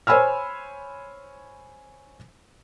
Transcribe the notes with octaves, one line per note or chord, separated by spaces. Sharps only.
C5 C#5 G#5 B5 E6 F6